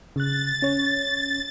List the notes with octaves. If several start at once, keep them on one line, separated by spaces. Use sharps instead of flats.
C#3 F#6 A6
C#4 C#5